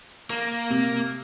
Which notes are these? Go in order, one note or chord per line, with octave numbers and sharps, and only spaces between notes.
A#3
C3